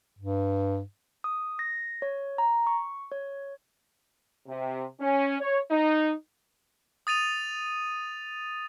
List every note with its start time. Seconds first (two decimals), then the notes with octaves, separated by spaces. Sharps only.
0.19 G2
1.24 D#6
1.59 A#6
2.02 C#5
2.38 A#5
2.67 C#6
3.12 C#5
4.46 C3
5.00 C#4
5.40 C#5
5.71 D#4
7.07 D#6 A6 D#7 F7